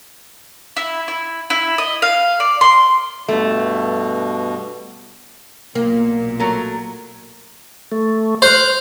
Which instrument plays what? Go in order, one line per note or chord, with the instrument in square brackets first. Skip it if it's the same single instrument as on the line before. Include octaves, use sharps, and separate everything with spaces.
[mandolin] E4
E4
E4
D#5
F5
D5
C6
[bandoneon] G2 B2 [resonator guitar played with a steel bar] A3
[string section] B1 A#2 [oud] A#3
[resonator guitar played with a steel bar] F#3 A3 A#4
[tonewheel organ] A3
[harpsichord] C5 [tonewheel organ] F6 F#6